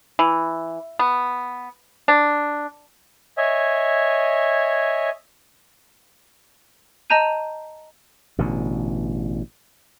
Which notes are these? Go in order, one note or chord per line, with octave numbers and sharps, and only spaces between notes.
E3
B3
D4
C#5 D#5 E5 G#5
D#5 A5 A#5 G6 D#7
A1 B2 D3